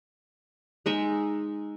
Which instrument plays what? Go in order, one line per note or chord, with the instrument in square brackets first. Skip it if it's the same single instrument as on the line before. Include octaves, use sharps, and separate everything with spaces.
[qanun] G#3 D#4 E5